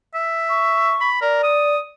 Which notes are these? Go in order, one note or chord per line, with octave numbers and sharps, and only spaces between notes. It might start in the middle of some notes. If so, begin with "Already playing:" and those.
E5
C#6
B5
A#4 D5
D#6